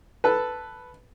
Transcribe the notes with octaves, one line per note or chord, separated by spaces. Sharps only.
A4 B4